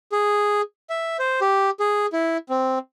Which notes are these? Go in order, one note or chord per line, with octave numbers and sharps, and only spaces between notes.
G#4
E5
C5
G4
G#4
E4
C4